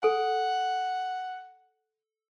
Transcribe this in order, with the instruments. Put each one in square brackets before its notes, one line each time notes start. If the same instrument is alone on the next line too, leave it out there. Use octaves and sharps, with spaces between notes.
[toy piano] A4 G#5 [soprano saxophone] F#5